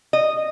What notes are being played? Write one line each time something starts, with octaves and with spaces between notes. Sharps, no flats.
D#5